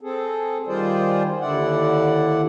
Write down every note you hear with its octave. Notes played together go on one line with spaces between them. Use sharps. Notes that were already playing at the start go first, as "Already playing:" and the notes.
C4 G#4 A4
D#3 G3 F4 G#4 C5 D5
D#2 D3 E4 D5 F#5